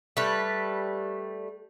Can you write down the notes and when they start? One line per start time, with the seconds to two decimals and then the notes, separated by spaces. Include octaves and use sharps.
0.17 G3 A3 B4